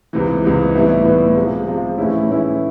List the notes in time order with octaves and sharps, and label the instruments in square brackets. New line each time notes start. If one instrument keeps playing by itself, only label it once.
[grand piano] C#2 C3 E3
C#2 C3 E3
A2 E3 G3 B3 E4
A2 E3 G3 B3 E4
C3 F3 G#3
C3 F3 G#3
A2 E3 G#3 C#4 E4
A2 E3 G#3 C#4 E4